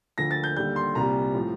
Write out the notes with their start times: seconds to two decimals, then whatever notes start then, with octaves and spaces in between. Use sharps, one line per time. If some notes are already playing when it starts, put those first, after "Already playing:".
0.18 D2 D3 F3 A#6
0.31 A6
0.44 G6
0.56 D#2 D3 G3 G6
0.76 C6
0.95 C2 A#2 G3 A#5
1.34 A2 F3